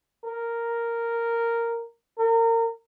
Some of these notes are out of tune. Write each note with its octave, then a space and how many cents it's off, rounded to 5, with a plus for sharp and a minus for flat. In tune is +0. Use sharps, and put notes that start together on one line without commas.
A#4 -5
A#4 -30